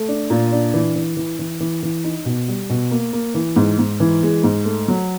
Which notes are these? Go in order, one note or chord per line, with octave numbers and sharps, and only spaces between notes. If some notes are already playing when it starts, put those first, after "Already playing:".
Already playing: A3
D4
A#2
D4
E3
E3
E3
E3
E3
E3
D#4
B2
G3
B2
A#3
A#3
E3
G#2
G#2
E3
G#3
G#2
A3
F#3